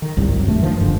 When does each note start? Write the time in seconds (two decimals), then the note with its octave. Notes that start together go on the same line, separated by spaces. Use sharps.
0.02 D#3
0.17 G1 C2 G#2 G3
0.32 F#2
0.45 D#1 G2 A3
0.62 G2 D#3 F3
0.81 E1 G2 D3